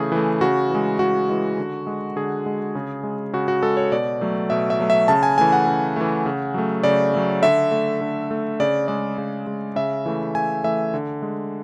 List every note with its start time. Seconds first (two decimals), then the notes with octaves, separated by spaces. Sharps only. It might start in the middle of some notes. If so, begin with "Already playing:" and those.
Already playing: C#3 E3 A3 G#4
0.12 E3 A3
0.41 C#3 F#4
0.70 E3 G#3
0.99 C#3 F#4
1.29 E3 G#3
1.58 D3
1.87 G#3
2.16 D3 G#4
2.46 G#3
2.75 C#3
3.03 G#3
3.33 C#3 F#4
3.48 F#4
3.63 G#3 A4
3.77 C#5
3.92 B2 D5
4.21 F#3 A3
4.50 B2 E5
4.70 E5
4.80 F#3 A3
4.90 E5
5.08 C#3 A5
5.23 G#5
5.38 E3 A3 G#5
5.52 F#5
5.67 C#3
5.96 E3 A3
6.26 C#3
6.54 F#3 A3
6.83 C#3 D5
7.14 F#3 A3
7.42 D3 E5
7.71 A3
8.01 D3
8.31 A3
8.60 C#3 D5
8.88 G#3 D5
9.18 C#3
9.47 G#3
9.76 C#3 E5
10.06 E3 A3
10.35 C#3 G#5
10.64 E3 A3 E5
10.94 D3
11.22 G#3